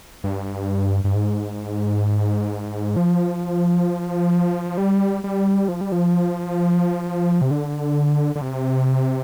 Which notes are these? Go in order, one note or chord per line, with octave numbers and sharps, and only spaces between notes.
G2
G2
G#2
F3
G3
G3
F3
G3
F3
C3
D3
D3
C3